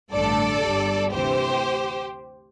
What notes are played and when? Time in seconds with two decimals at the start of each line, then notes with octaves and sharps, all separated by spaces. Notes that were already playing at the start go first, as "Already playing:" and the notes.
0.13 A1 G2 D3 A3 A4 D5
0.62 G1 G2 G3
1.12 D2 C3 E3 G4 C5